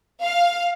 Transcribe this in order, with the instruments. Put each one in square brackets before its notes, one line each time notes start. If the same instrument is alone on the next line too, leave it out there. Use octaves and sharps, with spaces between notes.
[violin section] F5